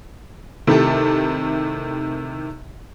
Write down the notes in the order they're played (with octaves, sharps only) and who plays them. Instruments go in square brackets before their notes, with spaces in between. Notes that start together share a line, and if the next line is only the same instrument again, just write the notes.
[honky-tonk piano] C3 D#3 A3 E4 G4 A4